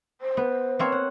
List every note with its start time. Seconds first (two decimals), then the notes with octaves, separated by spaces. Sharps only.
0.21 C5
0.37 B3
0.79 A#3 C4 C#5
0.92 F#5